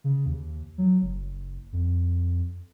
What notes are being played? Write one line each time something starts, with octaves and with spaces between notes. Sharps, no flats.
C#3
D#2
F#3
F#1
F2